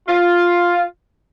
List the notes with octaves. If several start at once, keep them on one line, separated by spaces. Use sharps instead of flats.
F4